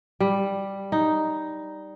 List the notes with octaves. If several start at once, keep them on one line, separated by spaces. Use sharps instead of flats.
G3
D#4